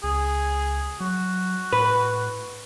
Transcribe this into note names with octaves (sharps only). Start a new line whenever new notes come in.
C#2 G#4
F#3 F#4
A2 B4